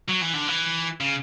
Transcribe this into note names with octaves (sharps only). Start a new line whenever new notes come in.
F#3
E3
D3
E3
C#3